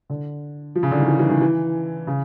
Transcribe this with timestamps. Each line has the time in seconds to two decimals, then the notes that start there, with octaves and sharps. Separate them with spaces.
0.10 D3
0.75 F3
0.83 C#3
0.91 D3
1.00 D#3
1.08 E3
1.19 E3
1.30 D#3
1.41 E3
2.07 C#3